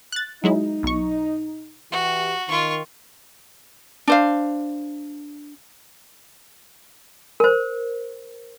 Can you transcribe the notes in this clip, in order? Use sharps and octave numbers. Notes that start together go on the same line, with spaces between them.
F#6 A6
F#3 G#3 D#4 E4
B1 C#6
E3 F#4 G4
D#3 F4 C#6
D4 C5 F5
A#4 C5